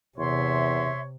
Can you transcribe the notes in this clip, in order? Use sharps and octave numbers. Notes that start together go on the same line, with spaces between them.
E2 C3 C#5 E5 C6